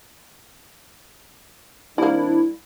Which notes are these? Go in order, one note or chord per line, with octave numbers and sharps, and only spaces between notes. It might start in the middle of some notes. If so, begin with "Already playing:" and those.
D#3 G3 A#3 C4 D4 E4